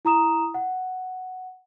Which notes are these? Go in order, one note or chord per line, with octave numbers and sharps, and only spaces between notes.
E4 A#5 D#6 E7
F#5